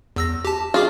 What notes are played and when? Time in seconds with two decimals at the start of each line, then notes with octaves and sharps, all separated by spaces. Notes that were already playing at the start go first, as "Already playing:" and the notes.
0.16 E2 E6 A#6
0.45 G4 A5
0.74 F4 F#4 G#4 D6